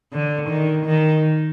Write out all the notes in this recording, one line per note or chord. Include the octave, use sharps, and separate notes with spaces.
D3
D#3
D#3